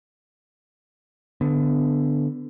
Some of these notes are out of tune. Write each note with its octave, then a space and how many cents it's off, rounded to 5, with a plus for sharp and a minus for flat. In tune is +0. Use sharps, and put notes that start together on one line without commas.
D3 +5 B3 +20